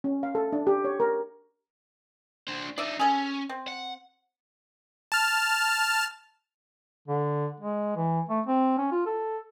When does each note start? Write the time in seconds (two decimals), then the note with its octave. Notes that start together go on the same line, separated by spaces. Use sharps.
0.04 C#4
0.23 F5
0.35 A4
0.52 D4
0.67 G4
0.85 C#5
1.00 A#4
2.48 D4 C5
2.78 D4 D#4 D5 E5
3.00 C#4 G#4 A4 G#5
3.49 C4
3.68 F#5
5.12 A5 F6
7.08 D3
7.60 G#3
7.96 E3
8.29 A3
8.46 C4
8.78 C#4
8.92 F4
9.06 A4